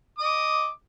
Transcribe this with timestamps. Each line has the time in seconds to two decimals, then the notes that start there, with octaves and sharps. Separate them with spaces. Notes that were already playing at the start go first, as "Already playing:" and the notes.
0.19 D#6
0.22 D#5
0.25 D6